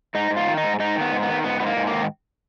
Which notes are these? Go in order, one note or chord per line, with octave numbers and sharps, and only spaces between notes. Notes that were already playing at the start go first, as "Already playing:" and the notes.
G#2 D#4
G#2
F4
D#3
D#4
G#2
G#2 D#4
D#3
B3
G#2
D#3 B3
G#2 B3
G#2 B3
A#3
G#2
A#3
D#3